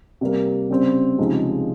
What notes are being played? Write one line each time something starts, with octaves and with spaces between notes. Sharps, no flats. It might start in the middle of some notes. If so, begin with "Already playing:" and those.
C3 G3 A#3
C#3 G3 C4
C#2 C3 F3 G#3 D#4